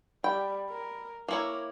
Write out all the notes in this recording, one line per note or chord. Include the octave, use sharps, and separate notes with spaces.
G3 G5 B5
A#4
A#3 E4 A#4 C#5 D6